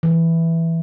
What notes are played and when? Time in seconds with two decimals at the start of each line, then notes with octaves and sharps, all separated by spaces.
0.03 E3